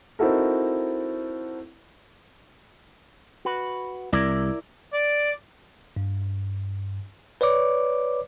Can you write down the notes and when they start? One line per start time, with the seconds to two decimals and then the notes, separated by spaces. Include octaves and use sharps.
0.19 C4 D#4 E4 F#4 A4 A#4
3.45 F#4 B4
4.13 C2 E4 A#4 D5
4.93 D5
5.96 G2
7.41 B4 C#5 D5 D6